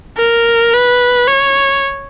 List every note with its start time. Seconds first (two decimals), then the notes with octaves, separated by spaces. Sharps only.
0.17 A#4
0.74 B4
1.28 C#5